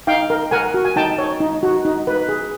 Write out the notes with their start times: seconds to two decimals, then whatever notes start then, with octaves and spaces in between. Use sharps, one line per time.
0.07 D#4 F5 G5
0.30 A#4
0.51 A#4 F#5 G#5
0.74 F#4
0.85 G#5
0.96 D#4 G5 A5
1.18 C#5
1.40 D#4
1.63 F#4
1.85 D#4
2.07 B4
2.29 G#4